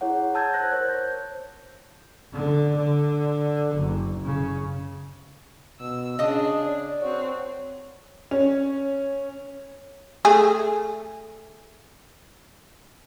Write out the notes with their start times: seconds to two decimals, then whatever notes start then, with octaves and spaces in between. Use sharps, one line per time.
0.01 E4 G#4 C#5 F#5
0.35 A5 E6 G6 G#6
0.54 C5 F#6 A#6
0.72 A#4 C5 C#5
0.89 G6
2.33 D3
2.76 D3
3.75 F#1
4.24 C#3
5.80 B2 E6
6.19 C#3 D4 G#4 D#5 D#6
6.67 D5
7.01 C4 F#4 C#5
8.31 C#4
10.25 A3 G#4